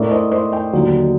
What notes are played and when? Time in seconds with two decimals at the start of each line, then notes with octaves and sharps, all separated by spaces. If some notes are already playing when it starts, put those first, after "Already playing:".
Already playing: A2 A3 D4 A#4 D5
0.11 C5 D#5
0.32 C5 D#5
0.52 D#5 G5
0.73 D#2 D3 F#3